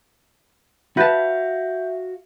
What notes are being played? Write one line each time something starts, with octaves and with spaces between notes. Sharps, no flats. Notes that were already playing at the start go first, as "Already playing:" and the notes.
F#4 B4 E5 F5 A5 G6